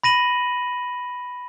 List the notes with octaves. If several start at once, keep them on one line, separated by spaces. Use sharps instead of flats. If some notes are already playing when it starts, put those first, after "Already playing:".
B5 A#6 D#7 F#7